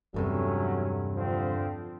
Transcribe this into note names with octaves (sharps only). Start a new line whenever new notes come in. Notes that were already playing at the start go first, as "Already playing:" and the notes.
E2 G2 C3 F#3 A3 C#4
D3 F3 C4